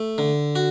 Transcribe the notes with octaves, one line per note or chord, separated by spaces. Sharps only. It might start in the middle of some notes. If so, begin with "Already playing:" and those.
Already playing: A3
D3
F#4